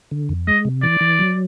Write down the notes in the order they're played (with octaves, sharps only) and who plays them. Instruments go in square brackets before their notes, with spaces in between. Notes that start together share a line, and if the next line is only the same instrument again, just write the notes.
[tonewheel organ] D3
F2
[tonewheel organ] G#3 [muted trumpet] D#5
[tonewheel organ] C3
[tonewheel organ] E3 [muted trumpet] D5
[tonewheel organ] E3
F#3